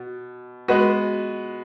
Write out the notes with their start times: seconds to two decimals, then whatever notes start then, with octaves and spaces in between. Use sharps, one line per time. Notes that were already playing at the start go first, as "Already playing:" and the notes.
Already playing: B2
0.68 G#3 B3 F#4 B4